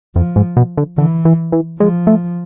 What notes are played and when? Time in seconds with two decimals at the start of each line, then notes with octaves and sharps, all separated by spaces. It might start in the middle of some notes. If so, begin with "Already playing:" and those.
0.16 F2 F3
0.36 G#2
0.57 B2
0.77 D3
0.98 D3 E3
1.25 E3
1.52 E3
1.79 F3 G#3
2.07 A3